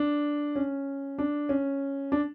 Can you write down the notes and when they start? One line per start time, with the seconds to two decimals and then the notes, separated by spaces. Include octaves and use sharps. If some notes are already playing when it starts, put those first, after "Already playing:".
Already playing: D4
0.56 C#4
1.18 D4
1.49 C#4
2.12 D4